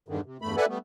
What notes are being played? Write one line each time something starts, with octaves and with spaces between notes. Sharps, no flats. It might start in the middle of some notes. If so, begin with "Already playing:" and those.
E2 G2 D3 D#3
C3
E2 G2 A3 B5
A4 B4 D5 E5 F#5 G#5
G3 A3 B3